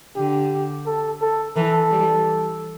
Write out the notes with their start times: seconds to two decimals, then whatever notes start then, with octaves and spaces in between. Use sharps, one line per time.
0.16 D3 G4
0.86 A4
1.21 A4
1.56 E3 A4
1.91 G3